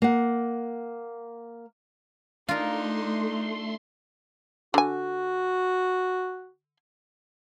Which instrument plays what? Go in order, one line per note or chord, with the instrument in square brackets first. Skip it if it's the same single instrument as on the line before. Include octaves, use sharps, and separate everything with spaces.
[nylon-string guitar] A#3 F#5
[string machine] A3 C6 [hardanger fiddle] D4 D#4 [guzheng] F4 A#4
[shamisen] D3 G#5 [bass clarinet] F#4